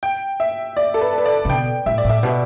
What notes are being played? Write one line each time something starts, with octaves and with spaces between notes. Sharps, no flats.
G5
E5
D5
A4
B4
B4
D5
D3
B2 G5
A2 E5
D5
A2 E5
B2